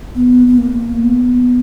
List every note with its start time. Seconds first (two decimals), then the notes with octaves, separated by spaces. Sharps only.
0.15 B3
0.47 B3
0.58 A#3
1.02 B3